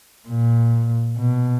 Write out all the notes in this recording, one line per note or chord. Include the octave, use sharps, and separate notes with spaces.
A#2
B2